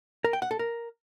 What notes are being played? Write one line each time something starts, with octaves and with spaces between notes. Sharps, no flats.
A#4
G5
F#5
A4
A#4